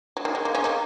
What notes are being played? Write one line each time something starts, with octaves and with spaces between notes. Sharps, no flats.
F#3
D#3
G#3
A#3
G#3 C#4
A#3 D#4